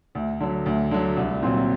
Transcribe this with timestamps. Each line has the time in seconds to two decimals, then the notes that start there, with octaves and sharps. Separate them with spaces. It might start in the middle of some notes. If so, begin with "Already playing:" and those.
0.15 D2
0.40 D3 F#3
0.66 D2
0.91 D3 F#3
1.17 C2
1.43 A#2 F#3 C4